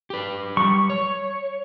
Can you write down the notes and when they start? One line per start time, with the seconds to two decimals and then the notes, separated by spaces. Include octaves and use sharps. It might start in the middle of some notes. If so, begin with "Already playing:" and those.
0.10 G4 B4
0.57 G3 C#6
0.90 C#5